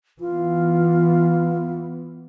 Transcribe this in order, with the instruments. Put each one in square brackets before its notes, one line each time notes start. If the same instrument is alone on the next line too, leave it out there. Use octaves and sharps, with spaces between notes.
[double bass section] E3 B3 [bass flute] F4